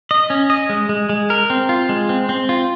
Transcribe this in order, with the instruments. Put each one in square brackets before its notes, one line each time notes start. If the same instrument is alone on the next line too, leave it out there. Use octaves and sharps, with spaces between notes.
[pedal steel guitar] D#5
C#4
D#5
G#3
G#3
G#3
A#4
C4
F4
G#3
C4
C4
F4